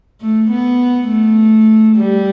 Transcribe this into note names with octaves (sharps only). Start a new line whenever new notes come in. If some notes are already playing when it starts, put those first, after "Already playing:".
A3
B3
A3
G3